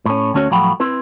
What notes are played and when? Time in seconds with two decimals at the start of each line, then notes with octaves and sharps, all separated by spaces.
0.06 A2 C#4
0.34 D2 A3 C#4 F#4 C#5
0.51 A2 F3 F#3 F#5 G5 B5
0.80 C4 E4 B4